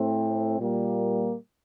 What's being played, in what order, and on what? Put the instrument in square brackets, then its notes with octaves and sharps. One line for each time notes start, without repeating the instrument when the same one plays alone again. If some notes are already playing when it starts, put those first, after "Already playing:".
Already playing: [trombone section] A2 A3 C4
A#2 G3 A#3